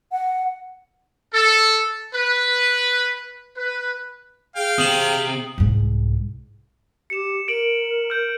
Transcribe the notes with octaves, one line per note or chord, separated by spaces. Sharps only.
F#5
A4
B4
B4
G#4 F5 G5
C3 D#6 F#7
C2 G#2
G4 C#7 E7
A#4 D7 F#7
F6 G6